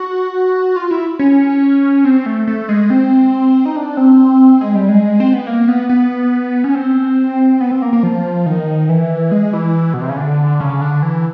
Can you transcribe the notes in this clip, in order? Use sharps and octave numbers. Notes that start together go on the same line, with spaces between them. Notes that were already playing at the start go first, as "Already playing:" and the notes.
Already playing: F#4
F4
E4
C#4
C4
A3
A3
G#3
C4
D#4
D4
C4
G#3
G3
G#3
C4
B3
A#3
B3
B3
C#4
C4
B3
C4
A#3
A#3
F3
D#3
E3
G#3
E3
B2
C3
C#3
D3
C#3
D3
E3